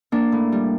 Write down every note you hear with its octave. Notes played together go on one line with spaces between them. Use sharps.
A#3 D4
A2
G3